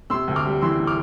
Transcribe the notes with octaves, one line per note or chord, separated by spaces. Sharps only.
C3 C6 E6
D2
D6 F6
G3
E3 C6 E6
C3
D6 F6